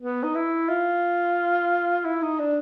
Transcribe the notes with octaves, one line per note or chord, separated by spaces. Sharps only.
B3
D#4
E4
F4
E4
D#4
D4